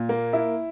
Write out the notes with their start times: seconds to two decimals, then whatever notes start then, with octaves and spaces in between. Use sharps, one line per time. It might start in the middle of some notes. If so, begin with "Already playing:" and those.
Already playing: A#2
0.09 A#3
0.33 E4